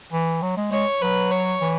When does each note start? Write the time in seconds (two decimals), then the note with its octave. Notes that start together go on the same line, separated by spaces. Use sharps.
0.13 E3
0.42 F#3
0.57 G#3
0.72 G#3 C#5
1.02 F#3 B4
1.32 C#5
1.61 E3